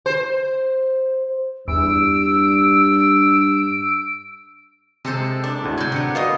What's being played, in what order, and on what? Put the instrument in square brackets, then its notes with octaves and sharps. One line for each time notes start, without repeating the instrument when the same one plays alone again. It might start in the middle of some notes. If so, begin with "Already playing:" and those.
[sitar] C5
[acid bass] E2 [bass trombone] G2 [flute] E6 [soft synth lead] D7
[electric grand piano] C3 [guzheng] G#3 A4 C5
[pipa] D4
[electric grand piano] D2 A2
[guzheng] C3 F#3 [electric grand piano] G6 G#6
[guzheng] D3 B3
[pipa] B2 F#4 D#5 [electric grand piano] F5